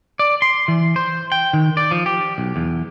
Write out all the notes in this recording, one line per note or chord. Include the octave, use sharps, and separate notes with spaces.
D5
C6
E3
C5
G5
D#3
D5
F3
G4
B1
E2